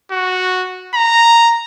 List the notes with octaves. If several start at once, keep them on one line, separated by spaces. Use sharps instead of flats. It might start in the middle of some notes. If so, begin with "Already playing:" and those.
F#4
A#5